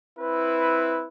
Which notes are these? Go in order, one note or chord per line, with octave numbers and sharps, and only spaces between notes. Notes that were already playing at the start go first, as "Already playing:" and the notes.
C4 E4 B4